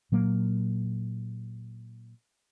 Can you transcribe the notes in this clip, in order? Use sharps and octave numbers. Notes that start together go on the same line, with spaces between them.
A#2 F#3 A#3